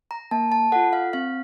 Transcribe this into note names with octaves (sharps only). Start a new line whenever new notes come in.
A#5
A#3 A5
A5
F4 A4 F#5
F5
C4 F5